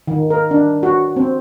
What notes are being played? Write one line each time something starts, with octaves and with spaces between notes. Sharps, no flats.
D#3
A#4
D4
F#4
C4